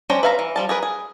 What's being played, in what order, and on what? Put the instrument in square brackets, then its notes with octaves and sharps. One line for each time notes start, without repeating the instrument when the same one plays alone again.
[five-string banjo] C#4 D4 C5 G5 A#5
B4 E5 F5 A5 A#5
E3
F3 G3 A5
G#4 A#4 B4
G#4